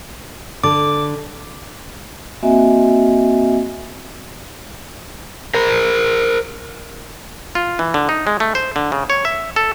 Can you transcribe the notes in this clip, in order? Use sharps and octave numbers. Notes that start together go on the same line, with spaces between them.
D3 D6
A#3 C4 F#4 D#5 E5 G#5
A#4 C5
F4
E3
D3
D#4
G#3
A3
C5
D3
C#3
C#5
E5
A4